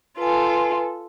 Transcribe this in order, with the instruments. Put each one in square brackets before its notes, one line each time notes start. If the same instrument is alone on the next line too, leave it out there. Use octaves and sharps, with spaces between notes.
[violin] F4 A4 [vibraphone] B4 G#5